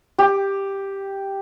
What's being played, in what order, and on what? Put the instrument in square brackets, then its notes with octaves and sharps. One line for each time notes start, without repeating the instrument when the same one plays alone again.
[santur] G4